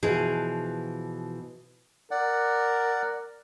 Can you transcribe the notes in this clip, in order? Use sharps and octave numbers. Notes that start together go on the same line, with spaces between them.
B2 E3 F3 F#4 G#4
A#4 D5 F#5